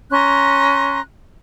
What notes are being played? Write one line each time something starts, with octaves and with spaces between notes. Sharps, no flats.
C#4 A#5 C6 F#6